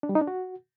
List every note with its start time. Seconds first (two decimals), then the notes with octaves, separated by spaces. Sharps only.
0.03 D4
0.09 G3
0.15 D#4
0.21 D4
0.27 F#4